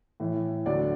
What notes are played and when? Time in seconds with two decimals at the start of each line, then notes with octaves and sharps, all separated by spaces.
0.20 A2 E3
0.66 D2 D3 F#3 D5